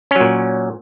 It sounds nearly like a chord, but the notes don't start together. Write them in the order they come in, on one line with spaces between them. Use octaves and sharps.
C#4 F#3 A#2